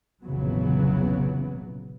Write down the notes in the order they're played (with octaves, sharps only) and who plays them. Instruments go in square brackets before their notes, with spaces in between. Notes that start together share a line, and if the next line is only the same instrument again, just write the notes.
[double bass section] F1 A#1 C#3 E3 F#3 B3